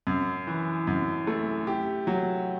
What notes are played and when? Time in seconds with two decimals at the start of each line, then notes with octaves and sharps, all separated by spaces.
0.07 F#2
0.47 E3
0.87 F#2
1.27 A3
1.67 G4
2.07 F#3